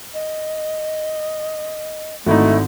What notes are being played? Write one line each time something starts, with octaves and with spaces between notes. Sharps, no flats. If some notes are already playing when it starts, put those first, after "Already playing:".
D#5
G#1 D3 A3 D#4 E4 F#4